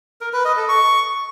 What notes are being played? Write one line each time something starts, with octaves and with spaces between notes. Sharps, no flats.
A#4
B4
D#5
A4
C#6